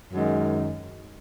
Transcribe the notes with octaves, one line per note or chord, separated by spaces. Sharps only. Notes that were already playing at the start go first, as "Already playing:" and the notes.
F#2 D#3 G#3